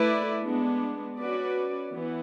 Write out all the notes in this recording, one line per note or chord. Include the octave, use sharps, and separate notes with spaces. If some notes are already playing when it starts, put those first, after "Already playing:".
Already playing: A3 E4 B4 D5
G#3 B3 D4
C#4 F#4 B4 D5
E3 B3